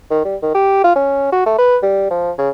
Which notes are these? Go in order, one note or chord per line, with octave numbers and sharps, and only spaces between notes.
D#3
G3
D#3
G4
F4
C#4
F#4
A3
B4
G3
F3
C#3